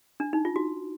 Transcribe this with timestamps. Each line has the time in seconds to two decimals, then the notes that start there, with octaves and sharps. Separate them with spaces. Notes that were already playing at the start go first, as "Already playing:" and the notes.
0.20 D4
0.33 D#4
0.45 F4
0.56 F#4